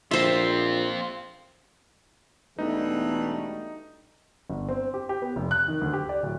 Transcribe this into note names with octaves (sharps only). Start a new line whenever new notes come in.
A#1 C4 F4 C5 E5
E1 B2 E3 G3 A3 D#4
G1
C4
G4
G4
B3
F1
F#6
D#3
D2
G4
D5
D1